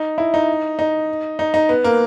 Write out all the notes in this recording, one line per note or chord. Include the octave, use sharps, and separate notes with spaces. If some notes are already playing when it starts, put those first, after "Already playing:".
Already playing: D#4
E4
D#4
D#4
D#4
D#4
B3
A#3